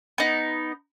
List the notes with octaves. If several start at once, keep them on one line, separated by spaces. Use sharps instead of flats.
B3 D#4